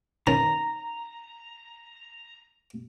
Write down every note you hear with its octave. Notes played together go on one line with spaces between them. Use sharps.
D#3 C#4 A5 A#5